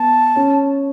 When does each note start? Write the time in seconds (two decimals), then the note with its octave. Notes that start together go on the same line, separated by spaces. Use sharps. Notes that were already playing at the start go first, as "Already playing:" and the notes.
Already playing: B3 A5
0.36 C#4